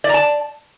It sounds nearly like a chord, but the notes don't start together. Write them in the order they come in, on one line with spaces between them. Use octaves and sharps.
D5 A#5 A5